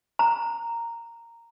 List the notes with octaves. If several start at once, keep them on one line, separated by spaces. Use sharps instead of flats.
A#5